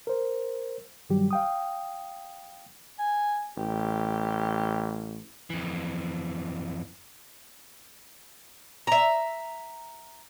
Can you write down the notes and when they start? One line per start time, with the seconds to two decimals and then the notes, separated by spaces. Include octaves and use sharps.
0.07 A#4 C5
1.10 G2 D#3 F#3 G3 G4
1.31 F5 G5 D#6
2.99 G#5
3.57 A1 G4
5.50 F2 E3
8.87 E5 A#5